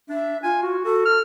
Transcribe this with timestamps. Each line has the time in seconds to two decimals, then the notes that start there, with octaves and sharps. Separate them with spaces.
0.09 D4 E5
0.43 F4 G#5
0.63 F#4
0.84 F#4 A4
1.05 F6